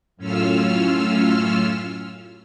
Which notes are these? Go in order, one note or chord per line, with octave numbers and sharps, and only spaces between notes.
F#2 A2 C#4 F4 E6 F6